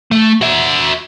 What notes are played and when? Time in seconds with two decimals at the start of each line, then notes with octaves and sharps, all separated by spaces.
0.11 A3
0.41 F#4 E5